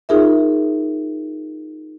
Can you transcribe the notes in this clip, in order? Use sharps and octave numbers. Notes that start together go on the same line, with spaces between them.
D#4 F4 G#4 A#4 E5